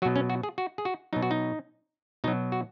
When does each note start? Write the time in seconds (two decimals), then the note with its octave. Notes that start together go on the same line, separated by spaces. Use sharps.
0.02 F#3 F#4
0.05 B2
0.16 C#4
0.30 F#4
0.43 G#4
0.58 F#4
0.78 G#4
0.85 F#4
1.13 B2 F#3 D#4
1.23 F#4
1.31 D#4
2.24 B2 D#4
2.28 F#3
2.52 F#4